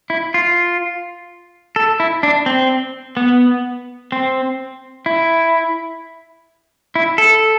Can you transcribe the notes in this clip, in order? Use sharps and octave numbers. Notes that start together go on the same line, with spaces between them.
E4
F4
A4
E4
D4
C4
B3
C4
E4
E4
A4